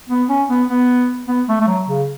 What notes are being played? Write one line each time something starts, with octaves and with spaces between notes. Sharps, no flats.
B3
C#4
B3
B3
B3
A3
A3
F#3
C#3